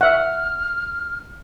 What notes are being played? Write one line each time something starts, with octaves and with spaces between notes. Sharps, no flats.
E5 F#5 F6